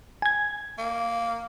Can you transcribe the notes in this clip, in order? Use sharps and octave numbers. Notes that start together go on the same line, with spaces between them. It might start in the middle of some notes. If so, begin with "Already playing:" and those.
G#5 G#6
A#3